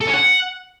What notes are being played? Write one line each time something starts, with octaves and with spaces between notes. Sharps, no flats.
A4
C#4
F#5